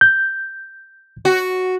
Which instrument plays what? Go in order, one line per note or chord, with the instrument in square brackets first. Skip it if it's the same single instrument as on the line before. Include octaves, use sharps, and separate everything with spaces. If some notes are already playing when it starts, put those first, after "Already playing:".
[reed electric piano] G6
[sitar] F#4